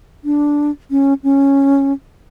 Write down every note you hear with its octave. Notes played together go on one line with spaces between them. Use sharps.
D4
C#4
C#4